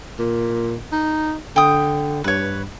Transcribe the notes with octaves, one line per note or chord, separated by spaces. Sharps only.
A#2
D#4
D3 G5 D#6
G2 B4 C#5